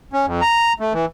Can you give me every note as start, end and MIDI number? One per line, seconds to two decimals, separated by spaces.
0.13 0.26 61
0.27 0.41 41
0.41 0.73 82
0.80 0.93 57
0.93 1.05 52